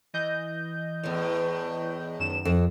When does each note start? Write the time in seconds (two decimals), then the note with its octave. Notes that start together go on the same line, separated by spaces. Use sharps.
0.14 E3 D#5 G6
1.03 E2 A2
2.19 F#2 D#3 E7
2.45 F2